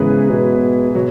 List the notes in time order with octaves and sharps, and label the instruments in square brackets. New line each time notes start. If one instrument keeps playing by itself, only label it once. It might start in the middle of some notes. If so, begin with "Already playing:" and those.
Already playing: [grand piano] G#2 E3 B3 G#4 B4 [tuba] C#3
[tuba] B2
[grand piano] F#3